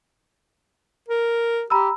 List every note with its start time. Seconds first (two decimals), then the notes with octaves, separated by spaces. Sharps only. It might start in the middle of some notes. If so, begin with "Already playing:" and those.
1.09 A#4
1.70 G4 A#5 B5 E6